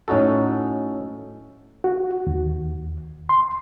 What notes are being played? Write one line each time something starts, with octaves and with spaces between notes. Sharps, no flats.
A2 C#4 D#4 F#4 A4
F#4
D#2
C6